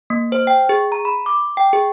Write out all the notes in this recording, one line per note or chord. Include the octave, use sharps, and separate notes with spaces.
A#3
C5
G5
G#4
A#5
B5
D6
G5
G#4